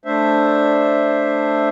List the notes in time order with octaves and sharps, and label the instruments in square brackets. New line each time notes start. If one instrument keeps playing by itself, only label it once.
[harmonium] A3 D4 C5 E5